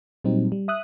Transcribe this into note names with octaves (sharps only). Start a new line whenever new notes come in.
A#2 F#3 G3 C4 D#4
G3
E5 D#6 F#6